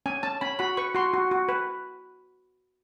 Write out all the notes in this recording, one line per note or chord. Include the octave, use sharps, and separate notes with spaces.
C#4 G#5
C#4 A5
C#4 B5
F#4 B5
B4 C#6
F#4 C6
F#4
F#4
B4